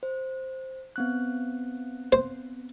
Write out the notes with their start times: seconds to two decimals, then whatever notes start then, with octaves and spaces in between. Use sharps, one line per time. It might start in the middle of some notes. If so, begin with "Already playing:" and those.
0.03 C5
0.96 B3 C4 F#6
2.12 C5